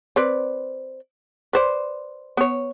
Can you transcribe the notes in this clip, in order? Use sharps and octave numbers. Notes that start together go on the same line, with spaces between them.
C4 B4 D5
B4 C5 D5
B3 C#5